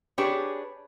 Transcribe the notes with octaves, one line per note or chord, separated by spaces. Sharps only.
D4 G4 G#4 B4 C#5